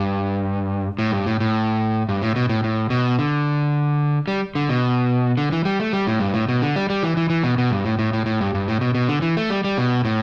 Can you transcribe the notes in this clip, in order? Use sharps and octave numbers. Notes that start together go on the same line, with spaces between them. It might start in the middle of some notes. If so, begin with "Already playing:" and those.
Already playing: G2
A2
G2
A2
A2
G2
A2
B2
A2
A2
B2
D3
G3
D3
B2
D3
E3
G3
A3
G3
A2
G2
A2
B2
D3
G3
G3
E3
E3
E3
B2
B2
G2
A2
A2
A2
A2
G2
G2
A2
B2
B2
D3
E3
A3
G3
G3
B2
A2